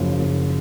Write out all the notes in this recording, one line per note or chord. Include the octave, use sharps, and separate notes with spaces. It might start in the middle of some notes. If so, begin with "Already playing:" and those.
Already playing: F#1 F#2 F3
F#1